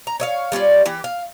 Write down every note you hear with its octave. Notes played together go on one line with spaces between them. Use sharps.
A#5
C#5 D#5 F5
G3 C#4 F4 D5
E3 G4
F5